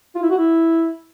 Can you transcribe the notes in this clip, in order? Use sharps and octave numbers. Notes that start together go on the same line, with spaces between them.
F4
E4
F#4
E4